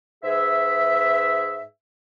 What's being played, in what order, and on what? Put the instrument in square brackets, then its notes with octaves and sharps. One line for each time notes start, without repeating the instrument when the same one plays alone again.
[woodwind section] G#2 G#4 B4 E5